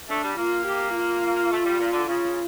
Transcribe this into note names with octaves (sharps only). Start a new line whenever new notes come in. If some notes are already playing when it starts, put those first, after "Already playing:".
A3 D4
G3
A#3 F4
G4
F4
A3
G3
A#2
D3
C#3 F4